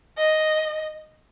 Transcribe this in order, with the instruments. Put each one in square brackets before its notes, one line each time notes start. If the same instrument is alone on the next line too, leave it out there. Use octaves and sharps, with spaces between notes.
[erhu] D#5